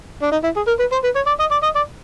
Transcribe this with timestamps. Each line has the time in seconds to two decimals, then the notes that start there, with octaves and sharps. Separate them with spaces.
0.22 D4
0.31 D#4
0.44 E4
0.56 G#4
0.67 A#4
0.79 B4
0.92 C5
1.03 B4
1.15 C#5
1.27 D5
1.40 D#5
1.51 D5
1.63 D#5
1.75 D5